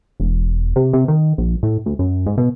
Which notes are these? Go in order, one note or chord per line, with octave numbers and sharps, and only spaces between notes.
E1
C3
C3
D#3
A#1
A2
D2
F#2
G#2
B2